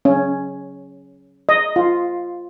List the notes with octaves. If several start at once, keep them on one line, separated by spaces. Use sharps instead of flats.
C#4
D#5
F4